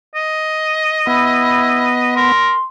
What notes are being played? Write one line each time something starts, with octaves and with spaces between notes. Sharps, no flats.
D#5
B3 E4
A#4 C6